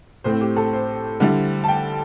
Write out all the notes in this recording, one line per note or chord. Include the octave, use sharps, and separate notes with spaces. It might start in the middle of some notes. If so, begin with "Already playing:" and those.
A2 A3 C4 C5
G4
A4
C5
D3 G3 E4
A5
G5